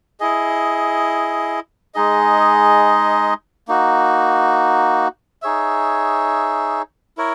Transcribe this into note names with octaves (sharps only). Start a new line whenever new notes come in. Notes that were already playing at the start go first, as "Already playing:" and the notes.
E4 G#4 D#5
G#3 D#4 G#4 D#5
A#3 D#4 F#4
D#4 G#4 C#5 E5
E4 A#4 C#5